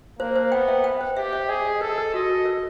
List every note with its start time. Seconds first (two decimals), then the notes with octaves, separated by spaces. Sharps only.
0.19 A#3 C5
0.36 C5
0.51 B3 G5
0.68 E5
0.84 G5
1.01 C5
1.17 G4 E5
1.33 E5
1.48 G#4 D#5
1.65 D#5
1.81 A4 A#4
1.98 A#4
2.14 F#4 D#5
2.29 A#4
2.46 A#4